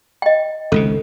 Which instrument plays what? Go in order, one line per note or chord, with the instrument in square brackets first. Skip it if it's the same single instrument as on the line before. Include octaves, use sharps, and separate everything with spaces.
[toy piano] D#5 G5
[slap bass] G#1 C#2 C3 [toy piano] A4